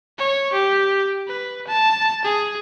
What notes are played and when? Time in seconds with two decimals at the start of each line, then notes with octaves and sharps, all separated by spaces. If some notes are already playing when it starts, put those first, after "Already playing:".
0.18 C#5
0.53 G4
1.28 B4
1.67 A5
2.24 G#4